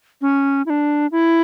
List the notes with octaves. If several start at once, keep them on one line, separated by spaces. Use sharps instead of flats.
C#4
E4
D4
E4